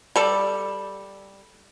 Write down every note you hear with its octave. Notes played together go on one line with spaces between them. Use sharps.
G3 A4 D5